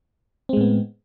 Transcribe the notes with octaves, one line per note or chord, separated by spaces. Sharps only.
A2 G#3 B3 C4